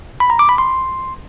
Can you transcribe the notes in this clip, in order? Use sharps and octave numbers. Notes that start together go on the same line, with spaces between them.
B5
A#5
D6
B5
C6